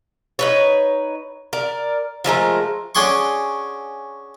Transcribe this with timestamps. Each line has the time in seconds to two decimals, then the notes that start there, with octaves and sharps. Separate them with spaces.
0.39 D#4 B4 C#5
1.53 A#4 D5
2.24 F3 G#3 A3 A#4
2.95 C#4 D4 F#4 G#4 C6 C#6